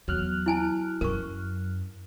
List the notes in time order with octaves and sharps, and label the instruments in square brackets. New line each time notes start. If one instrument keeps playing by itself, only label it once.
[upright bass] E2 [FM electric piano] F#3 F6 F#6
[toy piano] E4 G#5 A5
[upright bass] F#2 C#4 [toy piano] A#4 C#6